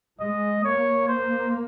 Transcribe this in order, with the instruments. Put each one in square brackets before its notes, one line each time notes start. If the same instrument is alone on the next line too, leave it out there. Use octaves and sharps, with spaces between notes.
[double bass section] G#3 [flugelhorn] D#5
[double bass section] A#3 [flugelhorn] C#5
[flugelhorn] C5